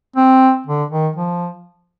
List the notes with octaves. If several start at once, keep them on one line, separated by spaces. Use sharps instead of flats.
C4
D3
D#3
F3